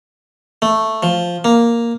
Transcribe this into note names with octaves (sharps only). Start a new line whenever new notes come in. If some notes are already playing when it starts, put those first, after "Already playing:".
A3
F3
A#3